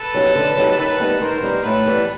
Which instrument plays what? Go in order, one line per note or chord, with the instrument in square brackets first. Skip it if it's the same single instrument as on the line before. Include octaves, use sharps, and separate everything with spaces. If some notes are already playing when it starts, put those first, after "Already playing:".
Already playing: [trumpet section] A4 B4
[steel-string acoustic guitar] F#3 B3 D#4 G4
D3
F#3 B3 D#4 G4
[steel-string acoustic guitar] D#3 [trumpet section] A4 B4
[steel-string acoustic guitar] G3 B3 D#4
[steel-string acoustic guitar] D#3 [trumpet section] A#4 C5
[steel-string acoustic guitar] G3 B3 D#4
[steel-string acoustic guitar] A2 [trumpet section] A4 B4
[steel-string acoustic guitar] E3 G3 B3